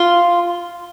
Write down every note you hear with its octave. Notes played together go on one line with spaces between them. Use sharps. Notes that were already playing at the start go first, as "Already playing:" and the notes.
Already playing: F4